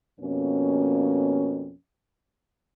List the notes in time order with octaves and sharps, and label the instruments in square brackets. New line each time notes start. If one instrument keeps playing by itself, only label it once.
[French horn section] F2 B2 A#3 C#4